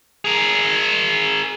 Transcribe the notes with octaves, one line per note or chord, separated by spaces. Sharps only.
G#4 A#4